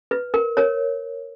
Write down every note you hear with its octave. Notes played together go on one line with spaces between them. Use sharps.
B4
A#4
A#4 C#5